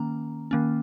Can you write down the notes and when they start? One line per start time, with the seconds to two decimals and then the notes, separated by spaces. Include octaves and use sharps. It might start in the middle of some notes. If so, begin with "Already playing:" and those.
Already playing: D#3 A#3 C#4 A#5
0.51 D#3 A#3 C#4